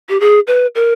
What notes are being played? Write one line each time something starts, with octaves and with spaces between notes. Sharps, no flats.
G4
G#4
B4
A#4